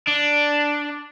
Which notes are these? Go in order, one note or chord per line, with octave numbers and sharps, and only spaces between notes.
D4